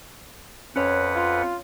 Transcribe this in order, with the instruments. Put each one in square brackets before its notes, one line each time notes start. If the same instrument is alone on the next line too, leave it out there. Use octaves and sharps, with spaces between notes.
[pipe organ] F2 B4 F#5 [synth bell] C#4 C#5
[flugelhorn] F4